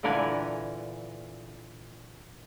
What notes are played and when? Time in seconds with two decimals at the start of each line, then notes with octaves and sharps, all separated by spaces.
0.03 A#2 D3 E3 A#4 B4 G#5